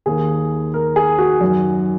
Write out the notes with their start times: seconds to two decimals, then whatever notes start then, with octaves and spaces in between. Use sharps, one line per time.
0.06 D#2 D#3 G#4
0.74 A#4
0.96 G#4
1.18 F#4
1.41 F#2 D#3